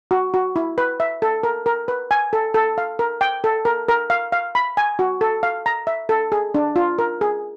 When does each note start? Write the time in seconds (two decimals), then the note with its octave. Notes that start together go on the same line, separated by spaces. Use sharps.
0.11 F#4
0.34 F#4
0.56 E4
0.78 B4
1.00 E5
1.22 A4
1.43 A#4
1.66 A#4
1.88 B4
2.11 G#5
2.33 A4
2.54 A4
2.78 F5
2.99 A#4
3.21 G5
3.44 A4
3.65 A#4
3.89 A#4
4.10 F5
4.32 F5
4.55 B5
4.77 G#5
4.99 F#4
5.21 A4
5.43 F5
5.66 A#5
5.87 E5
6.09 A4
6.32 G#4
6.54 D4
6.76 F4
6.99 A#4
7.21 G#4